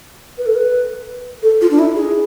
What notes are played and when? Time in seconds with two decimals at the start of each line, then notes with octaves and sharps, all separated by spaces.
0.38 B4
0.46 A4
0.55 B4
1.43 A4
1.61 F4
1.71 D4
1.79 E4
1.96 G#4